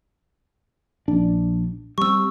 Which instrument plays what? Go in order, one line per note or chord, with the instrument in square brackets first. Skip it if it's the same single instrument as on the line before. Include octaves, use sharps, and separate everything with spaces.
[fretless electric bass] A#1 D4
[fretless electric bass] G3 C4 [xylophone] C#6 E6